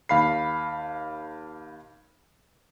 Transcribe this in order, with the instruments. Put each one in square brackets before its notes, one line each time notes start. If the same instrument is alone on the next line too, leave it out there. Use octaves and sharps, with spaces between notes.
[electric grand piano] D#2 F5 B5 C7